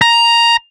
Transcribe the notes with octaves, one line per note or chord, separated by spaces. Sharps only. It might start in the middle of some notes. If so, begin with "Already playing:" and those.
A#5